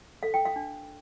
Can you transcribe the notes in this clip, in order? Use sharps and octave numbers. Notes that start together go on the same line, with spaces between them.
A4 F5
G5
F5
D4